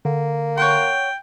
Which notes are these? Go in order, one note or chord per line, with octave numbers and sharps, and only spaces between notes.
D3 A#3
C#5 F#5 G5 C6